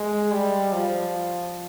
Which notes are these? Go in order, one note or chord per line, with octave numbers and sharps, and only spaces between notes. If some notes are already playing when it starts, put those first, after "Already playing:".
Already playing: G#3
G3
F3